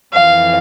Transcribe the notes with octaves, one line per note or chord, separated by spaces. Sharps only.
F2 E3 F5